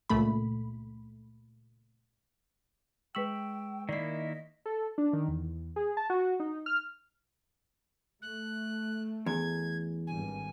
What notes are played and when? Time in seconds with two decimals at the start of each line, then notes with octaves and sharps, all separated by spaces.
0.09 C#2 A#2 A3 B5
3.15 G#3 B4 G5 C#6 E6 B6 F#7
3.89 D#3 A#3 E4 D5 D#5 C7
4.66 A4
4.98 D4
5.13 D#3
5.28 E2
5.76 G#4
5.97 A5
6.10 F#4
6.40 D#4
6.66 F6
8.22 A3 F#6
9.26 E2 G#6
10.07 G#1 G2 G#5